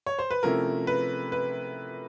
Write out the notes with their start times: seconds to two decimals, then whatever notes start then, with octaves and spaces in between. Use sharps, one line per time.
0.06 C#5
0.19 C5
0.31 B4
0.43 C3 F3 A3 C#4 E4 A#4
0.87 B4
1.32 B4